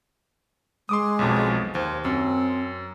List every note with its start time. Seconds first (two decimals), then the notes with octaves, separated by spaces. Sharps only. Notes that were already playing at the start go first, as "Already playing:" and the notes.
0.89 G#3 C6 D6 D#6
1.19 B1 F2 B2
1.75 D#2 C5
2.05 F#2 C4